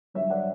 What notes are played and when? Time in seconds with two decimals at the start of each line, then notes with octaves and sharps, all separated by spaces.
0.14 G2 D3 F#3 C#5 E5
0.30 D5 F#5